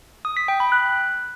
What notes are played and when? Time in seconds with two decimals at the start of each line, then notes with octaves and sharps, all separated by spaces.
0.25 D#6
0.37 B6
0.48 G5
0.60 B5
0.72 F#6